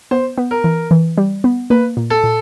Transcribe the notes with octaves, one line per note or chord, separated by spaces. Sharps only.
B3 C5
B3
A#4
E3
E3
G3
B3
A#3 B4
A#2
A4
A#2